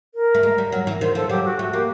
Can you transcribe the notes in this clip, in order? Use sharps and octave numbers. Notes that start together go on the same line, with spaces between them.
A#4
A3
G#3
G3
F#3
E3
D#3 C5
F3 A4
F#3 G4
F#4
A3 F#4
A#3 G4